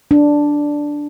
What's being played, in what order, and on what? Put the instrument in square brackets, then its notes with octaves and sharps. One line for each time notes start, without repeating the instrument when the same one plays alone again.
[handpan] D4